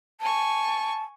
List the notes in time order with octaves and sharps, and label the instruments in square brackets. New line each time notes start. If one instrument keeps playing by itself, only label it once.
[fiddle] G#5 C#6 [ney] A5